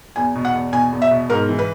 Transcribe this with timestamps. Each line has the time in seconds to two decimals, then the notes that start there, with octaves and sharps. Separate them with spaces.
0.16 E2 G#5
0.35 B2
0.45 F#5
0.54 E2
0.73 B2 G#5
0.93 E2
1.02 E5
1.11 B2
1.30 G#2 A#4
1.49 E3
1.59 B4